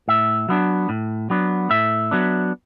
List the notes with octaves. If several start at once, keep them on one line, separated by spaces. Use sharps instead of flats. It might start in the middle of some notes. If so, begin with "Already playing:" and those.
A2 E5
F#3 B3 D4
A2
F#3 B3 D4
A2 E5
F#3 B3 D4